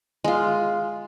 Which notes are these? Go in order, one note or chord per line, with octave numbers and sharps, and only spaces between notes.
G#3 F4